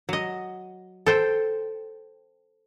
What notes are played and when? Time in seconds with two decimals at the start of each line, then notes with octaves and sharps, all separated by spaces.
0.09 F#3 D#5
1.06 A4 C5 G5